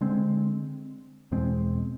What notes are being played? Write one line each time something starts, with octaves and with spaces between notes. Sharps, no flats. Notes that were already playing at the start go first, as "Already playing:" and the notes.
D3 G#3 C4
E2 B2 G#3 C4